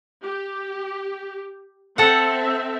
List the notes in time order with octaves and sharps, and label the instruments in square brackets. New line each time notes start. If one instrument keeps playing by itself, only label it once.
[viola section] G4
[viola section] C4 E5 [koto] A4 F#5